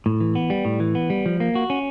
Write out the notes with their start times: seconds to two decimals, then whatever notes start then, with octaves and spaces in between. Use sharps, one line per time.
0.06 A2
0.21 E3
0.35 B3
0.50 G3
0.65 A2
0.80 E3
0.95 B3
1.10 G3
1.26 F3
1.40 A#3
1.55 F#4
1.70 C#4